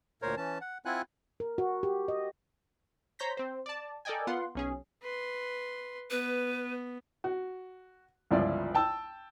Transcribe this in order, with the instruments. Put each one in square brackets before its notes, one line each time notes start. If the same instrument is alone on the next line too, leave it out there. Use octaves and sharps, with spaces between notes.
[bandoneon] D2 A#2 A#4 C5 C#5
E3 C#4 A5
F#5
C4 E4 F4 F#5 G#5 F#6
[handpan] A#4
F#4
G4
D#5
[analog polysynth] C5 C#5 A#5 G6 A#6 B6
C4 C5
D5 A5
A4 A#4 D5 D#5 G5 G#5
B3 F4 F#5 C6
B1 C#4 G#4
[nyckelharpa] B4 C6
[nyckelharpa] B3 [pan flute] B4
[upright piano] F#4
G1 C#2 F3 E4 F4 D5
G5 A5 E6